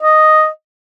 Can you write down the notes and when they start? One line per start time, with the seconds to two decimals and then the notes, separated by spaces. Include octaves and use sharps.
0.02 D#5